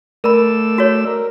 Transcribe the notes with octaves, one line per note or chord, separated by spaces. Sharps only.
A3 A#4 D5 B5 E6
F#4 C#5
A#4